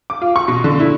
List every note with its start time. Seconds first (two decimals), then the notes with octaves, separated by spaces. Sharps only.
0.10 D6
0.21 F4
0.36 C#6
0.48 B2
0.64 D3
0.80 E4